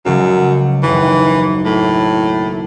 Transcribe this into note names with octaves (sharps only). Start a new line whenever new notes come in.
C#2 F#2 C#3 F#3
F#1 D#2 E3
A2